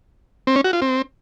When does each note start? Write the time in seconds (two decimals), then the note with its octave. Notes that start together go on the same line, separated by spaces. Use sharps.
0.47 C4
0.56 C#4
0.64 F#4
0.73 F4
0.82 C4